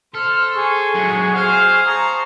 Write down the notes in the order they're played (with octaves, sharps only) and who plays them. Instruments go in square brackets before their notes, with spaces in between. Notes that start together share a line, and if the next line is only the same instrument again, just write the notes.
[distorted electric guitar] A4 [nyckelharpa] C5 [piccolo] F6
[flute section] G#4 [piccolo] C#6
[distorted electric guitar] F#2 G#3 [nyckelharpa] F#4
[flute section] G#4 [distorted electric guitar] C5 [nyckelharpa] F5
[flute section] A5 A#5 C#6 [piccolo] D#6